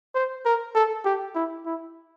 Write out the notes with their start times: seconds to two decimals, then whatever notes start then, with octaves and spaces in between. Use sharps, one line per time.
0.15 C5
0.45 A#4
0.75 A4
1.05 G4
1.35 E4
1.65 E4